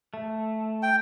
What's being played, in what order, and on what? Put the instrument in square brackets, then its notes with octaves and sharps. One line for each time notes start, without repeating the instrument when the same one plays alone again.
[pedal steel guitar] A3
[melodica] G5